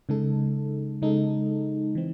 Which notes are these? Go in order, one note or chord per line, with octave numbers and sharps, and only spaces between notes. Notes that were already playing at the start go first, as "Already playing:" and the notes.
C#3 G#3 D#4 A4
C#3 G#3 D#4 A4
E3 C4